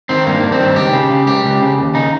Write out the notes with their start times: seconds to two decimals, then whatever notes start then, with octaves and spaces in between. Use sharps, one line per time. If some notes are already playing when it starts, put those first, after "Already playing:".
0.09 D#3 C4
0.26 G2 A#3
0.43 G2
0.52 C4
0.60 D#3
0.76 C#2 G4
0.93 C#3
1.10 C#3
1.27 C#2 G4
1.44 C#2
1.61 C#3
1.78 D#2
1.94 C#3 D#4